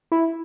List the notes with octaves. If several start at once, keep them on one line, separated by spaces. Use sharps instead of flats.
E4